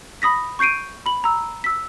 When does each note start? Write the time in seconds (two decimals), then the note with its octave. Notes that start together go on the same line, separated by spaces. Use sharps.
0.22 B5 D#6 A#6 B6
0.59 C#6 G6 C7 D7 D#7
1.06 B5 F#7
1.24 A#5 E6
1.64 E6 B6